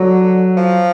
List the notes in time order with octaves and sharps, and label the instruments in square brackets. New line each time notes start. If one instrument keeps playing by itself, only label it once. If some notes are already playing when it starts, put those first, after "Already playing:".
Already playing: [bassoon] D3 [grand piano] F#3
[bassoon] F3